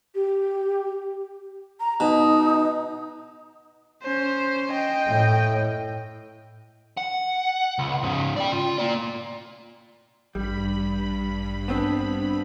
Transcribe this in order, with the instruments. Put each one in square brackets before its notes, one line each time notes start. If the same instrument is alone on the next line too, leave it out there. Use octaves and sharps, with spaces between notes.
[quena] G4
A#5
[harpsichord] B2 [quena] D#4
[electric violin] C#4 C5
D#5 G5
[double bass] A2
[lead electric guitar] F#5
C#2
G#2 C#3
D5 G5
F4
A#3 D5
[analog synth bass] A1 [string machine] G2 B5 [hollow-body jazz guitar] G3
[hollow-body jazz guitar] B3 C4 [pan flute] D4